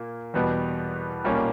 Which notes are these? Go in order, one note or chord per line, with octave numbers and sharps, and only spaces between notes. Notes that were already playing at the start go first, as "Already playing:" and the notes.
Already playing: A#2 A#3
E2 B2 G3 B3
B1 A#2 G3 A#3 C#4